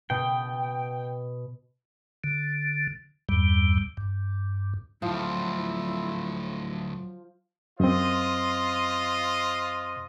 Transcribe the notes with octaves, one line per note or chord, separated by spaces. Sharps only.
B2 G5
D3
E2 G2 G3
G2
D2 A2 F3 F#3 E4
F#2 C4 F4 C5 D#5